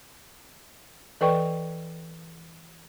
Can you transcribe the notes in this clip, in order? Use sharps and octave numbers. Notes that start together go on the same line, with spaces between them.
E3 A4 B4 D5 G5 C#6